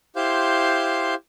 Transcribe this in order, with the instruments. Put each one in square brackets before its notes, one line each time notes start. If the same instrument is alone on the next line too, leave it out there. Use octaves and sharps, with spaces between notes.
[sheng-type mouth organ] E4 G4 C5 F5 C6 G6